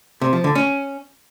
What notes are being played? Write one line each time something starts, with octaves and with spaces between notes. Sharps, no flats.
C3
F3
D3
C#4